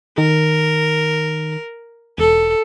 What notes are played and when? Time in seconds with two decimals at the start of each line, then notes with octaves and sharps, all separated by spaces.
0.18 D#3 A#4
2.18 E1 A4